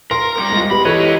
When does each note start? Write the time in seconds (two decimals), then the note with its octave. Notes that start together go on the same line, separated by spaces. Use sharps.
0.11 A#4 A#5 C6 A#6
0.37 C2 G3
0.52 G#3 F4
0.71 B3 G4 B5
0.85 C#2 E3 G4 A4 B4 C#5 D#5